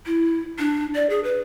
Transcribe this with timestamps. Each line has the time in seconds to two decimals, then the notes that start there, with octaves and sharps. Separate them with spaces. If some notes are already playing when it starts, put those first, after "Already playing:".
0.06 E4
0.59 D4
0.95 D5
1.10 G#4
1.24 B4